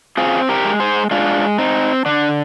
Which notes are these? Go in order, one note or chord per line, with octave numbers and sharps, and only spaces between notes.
C4 F4 G#4
G4 A#4
G#3
G#4 C5
G#3 D4 F4
C4 D#4
D3 D4